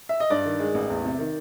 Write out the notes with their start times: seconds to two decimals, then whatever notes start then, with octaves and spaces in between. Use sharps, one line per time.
0.09 E5
0.20 D#5
0.30 G2 D5
0.46 D#3
0.60 G#3
0.74 A1
0.90 E2
1.04 C3
1.19 D#3